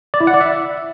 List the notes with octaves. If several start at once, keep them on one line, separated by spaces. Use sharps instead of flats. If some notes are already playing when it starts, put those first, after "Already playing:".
D5
E4
F#5
D5
E5